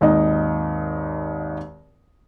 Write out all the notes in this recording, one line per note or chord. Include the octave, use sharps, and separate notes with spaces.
G#1 D#2 D#3 D#4 D#5